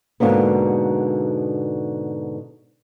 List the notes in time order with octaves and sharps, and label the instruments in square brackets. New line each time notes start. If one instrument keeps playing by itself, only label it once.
[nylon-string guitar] G#2 B2 D3 A#3 B3